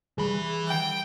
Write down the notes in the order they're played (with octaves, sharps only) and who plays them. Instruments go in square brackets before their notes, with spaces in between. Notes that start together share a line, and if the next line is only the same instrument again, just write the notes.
[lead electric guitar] E3 B5 [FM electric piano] G3 G#4
[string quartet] G5